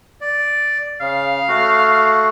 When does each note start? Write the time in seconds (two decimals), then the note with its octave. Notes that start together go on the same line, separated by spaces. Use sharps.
0.21 D5
1.01 C#3 F5
1.48 A3 F#4